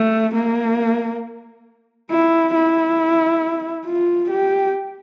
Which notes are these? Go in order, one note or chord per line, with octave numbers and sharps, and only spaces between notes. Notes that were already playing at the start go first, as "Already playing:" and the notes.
Already playing: A3
A#3
E4
E4
F4
G4